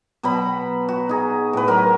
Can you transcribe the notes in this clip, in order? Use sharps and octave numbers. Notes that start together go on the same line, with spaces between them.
B2 F#3 A#5 B5
F#4
D#4 G#4
A2 B4
F#3 A#4 E5